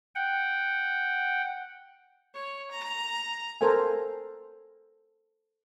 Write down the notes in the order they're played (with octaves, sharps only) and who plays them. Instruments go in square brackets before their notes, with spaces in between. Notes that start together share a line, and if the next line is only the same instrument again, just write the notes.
[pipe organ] F#5 G5
[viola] C#5
A#5
[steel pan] A4 A#4 C5 F5 G#5